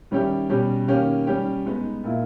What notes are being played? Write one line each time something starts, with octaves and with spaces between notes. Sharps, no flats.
D#3 G3 C#4 E4 G4
B2 G3 C#4 G4
D#3 A#3 C#4 G4
G3 C#4 G4
G#3 B3 D#4
A#2 A#3 E4